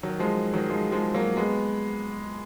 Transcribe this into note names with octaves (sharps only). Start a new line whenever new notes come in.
D#3 F#3
F3 G#3
D#3 F#3
F3 G#3
F3 G#3
F#3 A#3
G#3 B3